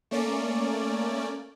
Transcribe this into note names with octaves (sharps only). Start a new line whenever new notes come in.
A3 A#3 C#4 D5